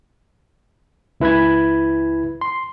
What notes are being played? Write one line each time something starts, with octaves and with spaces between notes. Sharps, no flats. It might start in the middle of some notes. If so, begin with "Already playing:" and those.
C#2 E4 B4 B5 G#6
C6